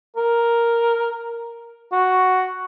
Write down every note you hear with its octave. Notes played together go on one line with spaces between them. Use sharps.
A#4
F#4